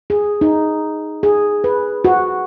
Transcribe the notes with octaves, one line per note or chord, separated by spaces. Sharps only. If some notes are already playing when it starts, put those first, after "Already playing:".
G#4
D#4
G#4
B4
F#4